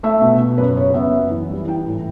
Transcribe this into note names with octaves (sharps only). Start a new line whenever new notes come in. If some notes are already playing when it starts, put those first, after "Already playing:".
A3 E5
B2
B2
F#2 B4
C#3 C#5
B3 E5
F#2
E3
G3
E3 G5
A2